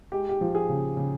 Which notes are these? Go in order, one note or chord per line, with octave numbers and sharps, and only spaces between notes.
G#3 G4
G4
F3
G#4
C#3
C#3